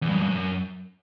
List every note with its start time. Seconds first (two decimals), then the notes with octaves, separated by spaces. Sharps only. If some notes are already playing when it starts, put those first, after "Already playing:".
0.02 E2
0.09 G2
0.15 F#2
0.22 G2
0.29 F#2